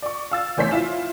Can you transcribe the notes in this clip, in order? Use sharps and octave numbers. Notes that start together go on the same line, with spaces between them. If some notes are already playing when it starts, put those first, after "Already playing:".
D5 C#6
F5 E6 A6
F1 E2 A3 C5 C#5 B6
E4 F4 E7